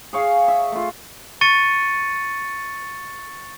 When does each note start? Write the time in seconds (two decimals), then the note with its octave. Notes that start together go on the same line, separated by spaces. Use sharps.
0.13 G#4 C#5 F5
0.48 E5
0.72 A3 F4
1.41 C#6 A6 C#7 D#7